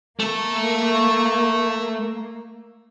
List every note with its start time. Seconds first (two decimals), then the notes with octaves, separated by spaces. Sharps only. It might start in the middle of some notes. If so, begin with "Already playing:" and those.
0.20 A3 A#3 A4